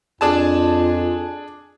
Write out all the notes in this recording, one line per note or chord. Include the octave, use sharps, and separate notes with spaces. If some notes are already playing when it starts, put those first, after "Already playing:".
F2 D4 F4 G#4 A5